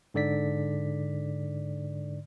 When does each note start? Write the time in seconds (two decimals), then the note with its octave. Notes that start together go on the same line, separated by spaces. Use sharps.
0.14 G#2 D3 D5 B6